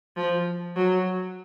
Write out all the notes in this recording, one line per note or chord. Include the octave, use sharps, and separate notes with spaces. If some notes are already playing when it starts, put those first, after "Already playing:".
F3
F#3